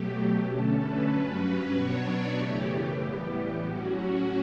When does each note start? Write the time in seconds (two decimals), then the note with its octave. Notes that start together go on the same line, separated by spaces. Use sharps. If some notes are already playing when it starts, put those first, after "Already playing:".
Already playing: B2 F#3 A3 G4
0.46 D3 A3 C#4 A4
0.78 B4
1.09 G2 F#3 C#4
1.73 B2 F#3 B3 D4 C#5
2.04 D5
2.36 F#2 C#3 E3 A3 G4
2.68 G4
2.98 A2 E3 G3 B3
3.62 A2 F#3 C#4 F#4
3.93 F#4